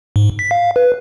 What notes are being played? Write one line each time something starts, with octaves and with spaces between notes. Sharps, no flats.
G#2
B6
F5
B4